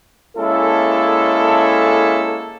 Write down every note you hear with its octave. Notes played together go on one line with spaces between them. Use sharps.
G#3 A#3 C#4 E4 A4